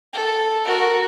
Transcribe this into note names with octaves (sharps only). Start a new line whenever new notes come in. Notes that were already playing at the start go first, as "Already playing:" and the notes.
A4
F#4 A#4